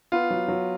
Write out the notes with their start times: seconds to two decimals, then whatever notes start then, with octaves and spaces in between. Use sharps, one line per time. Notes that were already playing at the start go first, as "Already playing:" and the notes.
0.12 B3 F4
0.30 F#3
0.48 F#3